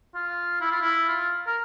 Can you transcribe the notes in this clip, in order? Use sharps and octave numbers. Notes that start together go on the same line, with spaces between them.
F4
E4
F4
E4
F4
A#4